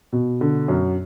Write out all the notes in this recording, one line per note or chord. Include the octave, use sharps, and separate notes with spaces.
B2
D3
F#2